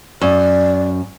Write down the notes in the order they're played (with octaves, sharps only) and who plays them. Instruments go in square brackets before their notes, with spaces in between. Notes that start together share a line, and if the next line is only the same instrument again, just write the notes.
[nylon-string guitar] F#2 [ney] D5